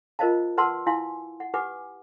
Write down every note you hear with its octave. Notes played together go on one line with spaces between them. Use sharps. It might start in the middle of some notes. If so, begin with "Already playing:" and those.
F4 A#4 C5 D#5 F5 A5
B4 F#5 A5 C6 E6
E4 F5 G#5 C6
F#5
G4 B4 F#5 G#5 D6